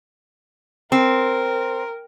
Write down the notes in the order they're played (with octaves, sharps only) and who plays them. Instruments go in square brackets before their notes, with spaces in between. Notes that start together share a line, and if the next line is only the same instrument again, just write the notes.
[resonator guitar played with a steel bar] C4 [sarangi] A#4